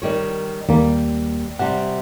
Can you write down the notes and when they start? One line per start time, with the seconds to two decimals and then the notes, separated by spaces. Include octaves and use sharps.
0.02 D#3 G3 C#5
0.68 D#2 G3 A#3
1.59 C3 G3 F#5